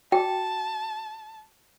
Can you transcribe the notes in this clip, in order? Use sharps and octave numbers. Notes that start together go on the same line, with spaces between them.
F#4 G5 A5